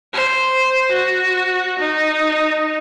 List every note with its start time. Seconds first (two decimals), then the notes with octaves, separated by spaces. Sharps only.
0.13 C5
0.92 F#4
1.79 D#4